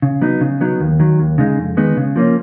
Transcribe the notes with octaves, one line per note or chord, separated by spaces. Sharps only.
C#3
F#3 B3 D#4
C#3
F#3 B3 D#4
D#2
D#3 F#3
D#2
C#3 G#3 D#4
F2
D#3 G#3 B3 D#4
C#3
F3 A#3 C#4